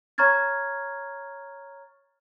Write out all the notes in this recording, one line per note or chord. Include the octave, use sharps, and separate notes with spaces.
C#5 A#5 C#6 F6 G#6 A6